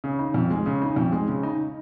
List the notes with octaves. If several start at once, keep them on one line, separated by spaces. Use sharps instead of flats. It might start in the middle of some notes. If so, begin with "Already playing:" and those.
C#3
D#4
F2
G#3
C#3
D#4
F2
G#3
C#3
D#4